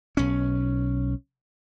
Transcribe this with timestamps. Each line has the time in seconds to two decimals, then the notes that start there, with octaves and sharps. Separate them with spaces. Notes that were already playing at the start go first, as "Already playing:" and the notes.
0.17 B1 C#4